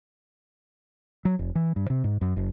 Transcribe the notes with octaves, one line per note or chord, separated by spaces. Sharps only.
F#3
F1
E3
G2
C3
G#2
F#2
F#1